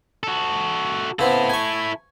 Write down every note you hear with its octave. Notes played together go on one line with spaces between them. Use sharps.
F#4 A4
C#3 B3 C4 E4 A4
G#5 C#6